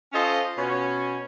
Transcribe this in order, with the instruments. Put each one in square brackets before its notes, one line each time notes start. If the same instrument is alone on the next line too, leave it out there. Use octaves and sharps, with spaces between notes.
[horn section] C#4 F4 A4 C5 D#5
B2 C#4